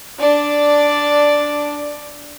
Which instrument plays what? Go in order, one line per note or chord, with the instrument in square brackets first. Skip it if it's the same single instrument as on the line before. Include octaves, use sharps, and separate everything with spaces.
[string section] D4 [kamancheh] D5